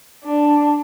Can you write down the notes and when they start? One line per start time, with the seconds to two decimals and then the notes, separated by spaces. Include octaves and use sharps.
0.24 D4